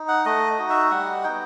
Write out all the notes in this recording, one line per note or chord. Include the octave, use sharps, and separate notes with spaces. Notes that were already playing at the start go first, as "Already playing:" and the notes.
Already playing: D#4
F#5
A3 D#5
D#4 F#4
E5
G3 F#5
B3 D#4 G5